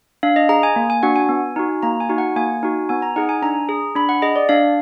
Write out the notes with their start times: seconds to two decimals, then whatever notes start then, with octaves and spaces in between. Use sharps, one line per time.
0.23 D4 F5
0.36 D#5
0.49 G#4 A#5
0.63 G#5
0.76 A#3
0.90 G#5
1.03 D4 F#4 F#5
1.16 G#5
1.29 B3
1.56 D#4 F#4
1.83 A#3 A#5
2.00 G#5
2.09 D#4 F#4
2.18 F#5
2.36 A#3 G#5
2.63 D#4 F#4
2.89 B3 G#5
3.02 A#5
3.16 D#4 G#4 F#5
3.29 G#5
3.42 D4 A#5
3.69 G#4
3.95 D4 B5
4.09 F#5
4.22 G#4 D#5
4.36 D5
4.49 D4 F5